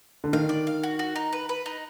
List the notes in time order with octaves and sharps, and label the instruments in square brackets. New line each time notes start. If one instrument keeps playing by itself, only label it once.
[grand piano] D3
[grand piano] D#3 [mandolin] F5
[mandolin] D5
F5
F#4
F#4
D#4
B4
B4
D#4